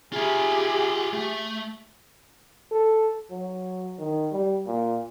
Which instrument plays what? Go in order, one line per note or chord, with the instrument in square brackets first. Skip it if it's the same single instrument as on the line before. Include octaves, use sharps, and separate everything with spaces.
[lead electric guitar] F4 E5 [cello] G4 G#4
[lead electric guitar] A3
[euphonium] A4
F#3
D#3
G3
A#2